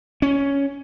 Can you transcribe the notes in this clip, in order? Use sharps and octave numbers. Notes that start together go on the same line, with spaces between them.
C#4